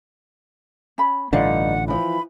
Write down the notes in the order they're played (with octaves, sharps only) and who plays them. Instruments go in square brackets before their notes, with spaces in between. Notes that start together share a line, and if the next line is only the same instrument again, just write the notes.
[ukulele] C#4 B5
[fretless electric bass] A1 D3 [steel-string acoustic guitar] G2 D#4 [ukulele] F4 D5 F5 [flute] F#5
[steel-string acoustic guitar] E3 F3 [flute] B5